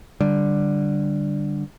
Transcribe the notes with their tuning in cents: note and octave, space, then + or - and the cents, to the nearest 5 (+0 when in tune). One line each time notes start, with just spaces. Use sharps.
D3 +0 G3 +0